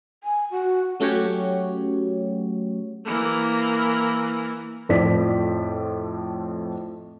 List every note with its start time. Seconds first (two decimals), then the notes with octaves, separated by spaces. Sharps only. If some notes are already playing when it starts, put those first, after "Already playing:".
0.24 G#5
0.51 F#4
1.00 F#3 A3 C#4 F#4 G4 C#5
3.05 E3 A#3
4.89 F2 A2 F3 D5 B6